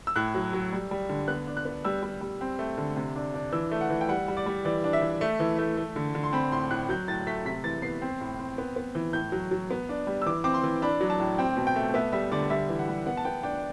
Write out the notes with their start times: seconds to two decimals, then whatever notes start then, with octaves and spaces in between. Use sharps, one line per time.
0.07 E6
0.16 A2 F#6
0.35 F#3
0.53 F#3
0.73 G3
0.91 G3
1.09 D3
1.28 B3 F#6
1.47 D4
1.57 F#6
1.65 B3
1.85 G3 E6
2.03 G3
2.21 G3
2.41 C4
2.59 A3
2.78 D3
2.97 C3
3.16 D4
3.34 D4
3.52 E3 E6
3.72 A3
3.81 F#5
3.90 E3
4.01 G5
4.09 G3 F#5
4.28 G3
4.37 D5
4.46 G3
4.65 E3 D5
4.84 D4
4.93 E5
5.02 E3
5.21 A3
5.40 E3
5.59 A3
5.77 A3
5.96 D3
6.15 D3
6.24 C6
6.33 C4 B5
6.52 A2 C6
6.70 A2 F#6
6.89 F#3 G6
7.08 A2 A6
7.27 A3 B6
7.45 C3 B6
7.64 E3 A6
7.82 B3 C7
8.02 C4
8.20 A2
8.39 C4
8.58 B3
8.76 B3
8.95 E3
9.13 A2 G6
9.32 F#3
9.51 F#3
9.71 B3
9.89 D4
10.07 G3
10.22 E6
10.26 E3 D6
10.44 C4 D6
10.54 C6
10.64 E3
10.82 D4 B5
11.01 F#3
11.10 A5
11.20 A2
11.38 C4 G5
11.57 B2
11.67 G5
11.76 A3
11.94 B3 E5
12.12 G3 E5
12.32 D3 D5
12.50 G3 E5
12.69 E3
12.79 F#5
12.88 G3
13.07 B3 F#5
13.17 A5
13.25 B3 G5
13.43 D4 G5